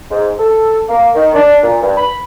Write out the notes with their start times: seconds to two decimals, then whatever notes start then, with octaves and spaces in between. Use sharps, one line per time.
0.11 G#2
0.39 A4
0.89 A#3
1.15 D#3
1.35 D4
1.63 A#2
1.81 G2
1.97 B5